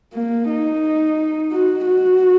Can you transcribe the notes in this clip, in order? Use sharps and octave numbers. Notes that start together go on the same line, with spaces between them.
A#3
D#4
F#4
F#4